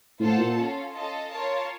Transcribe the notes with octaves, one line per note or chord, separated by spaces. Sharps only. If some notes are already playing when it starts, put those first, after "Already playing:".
A2 F4 A4 C5 F#5 A5
A#2
C#4 F4 A4
F4 A4 D#5 A5
F4 A#4 C#5 A5